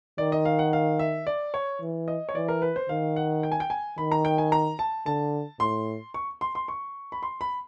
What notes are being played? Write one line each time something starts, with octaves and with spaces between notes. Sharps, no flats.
D#3 D5
D#5
F5
F#5
F5
E5
D5
C#5
E3
D#5
C#5
E3 D5
A#4
B4
C5
D#3 F5
F#5
G5
G#5
G5
G#5
D#3 B5
A#5
G5
G#5
A#5
A5
D3 A5
A2 C6
C#6
C6
C6
C#6
B5
C6
B5